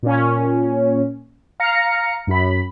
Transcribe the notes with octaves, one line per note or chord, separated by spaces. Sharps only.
A#2 C#4
F5 A#5 C#7
F#2 B5